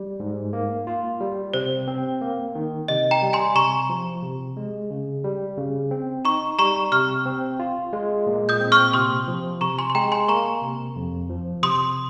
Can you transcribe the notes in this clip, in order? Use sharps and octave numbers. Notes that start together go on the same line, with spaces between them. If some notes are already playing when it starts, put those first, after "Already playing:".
Already playing: G3
G#2
A#3
F4
G3
C3 C5
C4
A#3
D#3
C3 D#5
G5 A#5
G3
G#5 C6
C3 A#5 C#6
F3
C3
G#3
C#3
G3
C#3
C4
D#4 A#5 C#6
G3 A#5 C#6
C3 C#6 F6
C4
F4
G#3
A#2
D#6 G6
C4
C#6 F6
C3 C6 D#6
F3
C3 A#5 C#6
G#5 C6
C6
G#3 G5 A#5
G#5 C6
A#3 A#5 C#6
C3
F2
F3
C3 C6 D#6